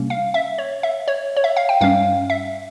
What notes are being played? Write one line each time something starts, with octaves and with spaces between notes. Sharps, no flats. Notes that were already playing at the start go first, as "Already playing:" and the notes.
Already playing: C3 G3 A#3 C#4
F5
E5
C#5
E5
C#5
C#5
E5
F5
G5
G2 G3 C#4 F5
E5